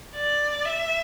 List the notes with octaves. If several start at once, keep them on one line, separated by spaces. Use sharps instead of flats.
D5
E5